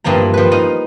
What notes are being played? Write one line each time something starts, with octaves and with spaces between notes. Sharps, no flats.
G2 E3 F3 A#3 A#5
F3 B4
D#4 D#5 F5